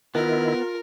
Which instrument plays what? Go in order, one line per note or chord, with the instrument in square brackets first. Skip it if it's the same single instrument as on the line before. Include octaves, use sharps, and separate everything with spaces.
[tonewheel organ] D#3 E4 [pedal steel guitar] B3 [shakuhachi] F4 [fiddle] A#4